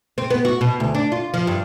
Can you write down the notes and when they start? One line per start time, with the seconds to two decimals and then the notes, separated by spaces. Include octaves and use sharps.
0.18 C4
0.30 B3
0.45 F#4
0.61 B2
0.80 D2
0.95 D4
1.12 F4
1.34 F3
1.47 G2